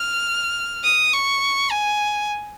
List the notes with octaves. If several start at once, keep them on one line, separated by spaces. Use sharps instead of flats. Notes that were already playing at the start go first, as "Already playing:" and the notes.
Already playing: F6
D#6
C#6
G#5